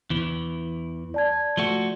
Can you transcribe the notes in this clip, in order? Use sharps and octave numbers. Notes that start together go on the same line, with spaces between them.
E2 E3
D5 A5 G#6
F3 A3 F#4